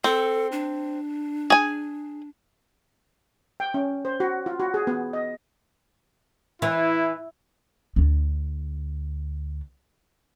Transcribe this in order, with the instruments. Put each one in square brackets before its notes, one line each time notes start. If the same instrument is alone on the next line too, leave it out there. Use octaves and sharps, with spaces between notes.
[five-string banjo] C4 [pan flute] A4
[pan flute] D4
[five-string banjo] G#4 G#5
[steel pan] G5
C#4
C5
F#4
F4
F#4
G#4
B3
D#5
[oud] E3 [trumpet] E4
[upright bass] D2 D4